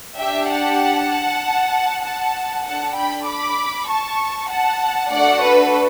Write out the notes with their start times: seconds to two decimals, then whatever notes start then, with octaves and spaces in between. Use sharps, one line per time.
0.18 D4 G4 E5 G5
0.49 F#5 A5
2.03 F#5 A5
2.64 D4 A4 F#5 A5
2.95 G5 B5
3.26 B5 D6
3.88 A5 C#6
4.49 F#5 A5
5.11 A3 D4 F#4 A4 D5 F#5
5.42 B4